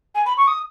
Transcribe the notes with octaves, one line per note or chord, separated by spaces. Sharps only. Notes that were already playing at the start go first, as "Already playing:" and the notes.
G#5
B5
C#6
D#6